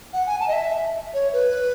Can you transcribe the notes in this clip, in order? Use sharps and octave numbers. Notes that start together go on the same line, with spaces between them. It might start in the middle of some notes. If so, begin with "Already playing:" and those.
F#5
G#5
A5
D#5
E5
C#5
B4